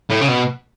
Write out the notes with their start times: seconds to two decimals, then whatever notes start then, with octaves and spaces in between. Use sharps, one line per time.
0.10 A2
0.21 C#3
0.29 B2